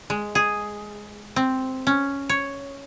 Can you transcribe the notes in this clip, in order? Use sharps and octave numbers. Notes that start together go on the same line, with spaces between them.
G#3
G#4
C4
C#4
C#5